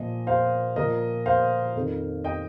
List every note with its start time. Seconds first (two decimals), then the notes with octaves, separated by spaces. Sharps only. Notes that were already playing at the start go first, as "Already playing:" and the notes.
Already playing: A#2 F3 D#5
0.27 C5 F5
0.76 A#2 F3 A#4 D#5
1.26 C5 F5
1.75 F2 D#3
2.24 D#5 G5